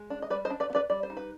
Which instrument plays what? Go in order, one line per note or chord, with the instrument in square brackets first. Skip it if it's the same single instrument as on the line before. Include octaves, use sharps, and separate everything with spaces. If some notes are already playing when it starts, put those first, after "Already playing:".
Already playing: [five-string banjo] G#3
D4
D#5
G3 B4 D5
C5 D#5
D4
B4 D5
B3
B4 D5
G3 D5
C5
D#4
B4